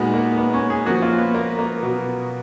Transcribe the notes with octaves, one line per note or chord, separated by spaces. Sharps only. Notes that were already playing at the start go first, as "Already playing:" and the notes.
Already playing: A#2 G#3 B3 D#4 F#4
A#3
B3
C#4
G#4
F3 A#3 C#4 F#4
F4
B3
A#3
A#3
B2 F#3 B3 F#4